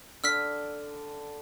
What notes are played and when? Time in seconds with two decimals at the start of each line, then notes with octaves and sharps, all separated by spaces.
0.24 D3 E6 F6 B6